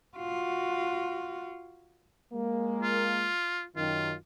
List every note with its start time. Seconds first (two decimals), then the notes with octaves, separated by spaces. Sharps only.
0.17 F4 F#4
2.33 G#3 A#3
2.82 F4
3.76 F#2 D#3 F4